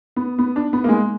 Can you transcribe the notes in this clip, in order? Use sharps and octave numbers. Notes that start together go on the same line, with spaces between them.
B3
B3
D4
B3
A#3
G#3